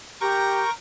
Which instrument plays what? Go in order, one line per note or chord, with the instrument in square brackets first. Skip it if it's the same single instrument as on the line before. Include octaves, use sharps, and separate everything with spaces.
[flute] G4 [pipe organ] A#4 G5 C#6 [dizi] A#5